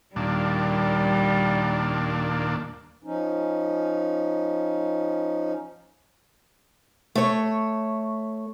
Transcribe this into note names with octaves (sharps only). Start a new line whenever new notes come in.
D#2 A#2 G3 D4
F3 C#4 D#4
A3 C#5